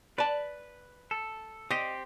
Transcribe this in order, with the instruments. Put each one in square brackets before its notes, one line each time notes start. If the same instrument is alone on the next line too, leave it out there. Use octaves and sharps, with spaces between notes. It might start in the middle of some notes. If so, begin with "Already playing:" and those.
[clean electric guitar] B4 [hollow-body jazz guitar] D5 A5
[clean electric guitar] A4
[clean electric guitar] C4 G4 [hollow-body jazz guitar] D#5